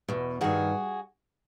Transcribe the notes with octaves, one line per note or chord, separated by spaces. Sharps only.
E2 B2
G2 D#3 F#4 G#4